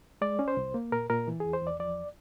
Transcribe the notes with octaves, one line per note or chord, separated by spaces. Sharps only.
G#3 D5
C#4
C5
C2
A#3
A#2 A#4
A#2 A#4
E3
E2 G#4
C5
E2
D5
F3 D5